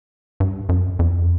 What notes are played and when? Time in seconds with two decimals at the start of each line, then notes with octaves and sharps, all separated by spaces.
0.40 G2
0.69 F#2
0.99 F2